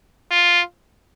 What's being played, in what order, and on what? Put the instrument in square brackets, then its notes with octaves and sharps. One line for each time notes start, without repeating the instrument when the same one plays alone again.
[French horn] F4